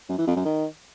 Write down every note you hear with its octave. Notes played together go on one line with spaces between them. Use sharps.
F#2
E3
F2
F#2
D#3